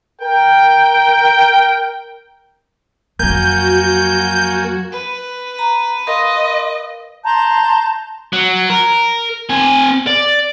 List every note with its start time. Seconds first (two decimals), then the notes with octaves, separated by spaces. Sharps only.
0.22 A#4 G5
3.19 F2 F#3 A#3 F#4 A#4 G#5 G6
4.92 B4
5.59 A#5
6.07 A#4 D#5 F5 C6
7.25 A5 A#5 C6 G6
8.33 F#3
8.70 A#4
9.50 C4 G#5
10.07 D5